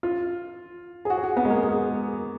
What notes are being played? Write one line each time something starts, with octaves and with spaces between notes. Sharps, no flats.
F4
G#4
F#4
G#4
F#4
B3
G#3
A#3
G#3